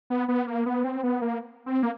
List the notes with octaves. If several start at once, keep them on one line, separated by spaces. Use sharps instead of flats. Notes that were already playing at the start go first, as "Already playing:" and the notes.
B3
B3
A#3
B3
C4
B3
A#3
C4
A#3